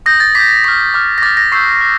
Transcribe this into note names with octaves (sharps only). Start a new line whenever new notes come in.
D#6 G6 A#6
A6
D6 G6 B6
C#6 F6 A#6
D6 F6
A#6
D6 F6 A6
A#6
C#6 E6 G6 C7
F6